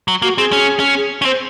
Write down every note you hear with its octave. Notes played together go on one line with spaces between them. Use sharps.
F#3
A#3 F#4
C4 G#4
C#4
C#4
G#4
C#4
C4 C5